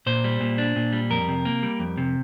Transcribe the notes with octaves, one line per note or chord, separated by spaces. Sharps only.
A#2 C5
G3
A#2
D4
A#2
G3
F2 A#4
C3
A#3
G3
F2
C3